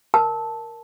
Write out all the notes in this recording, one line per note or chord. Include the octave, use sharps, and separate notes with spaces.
A#4 A5